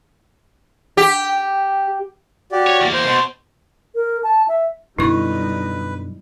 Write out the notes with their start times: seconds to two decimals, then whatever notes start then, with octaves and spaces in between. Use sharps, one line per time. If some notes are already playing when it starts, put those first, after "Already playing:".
0.97 G4
2.52 F#4 G4 D5
2.67 C#5
2.81 E2 A#3
2.94 C5 C6
3.07 B2
3.95 A#4
4.23 A5
4.48 E5
4.99 F#2 B2 D3 G3 D#4 E4 B4 C#6